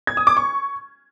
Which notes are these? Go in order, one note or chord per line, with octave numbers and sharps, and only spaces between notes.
G#6
D#6
D6
C#6